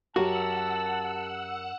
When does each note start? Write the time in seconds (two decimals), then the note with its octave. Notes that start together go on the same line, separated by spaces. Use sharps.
0.16 F#2 F#4 G4 A#4 F#5 A5 E6 F#6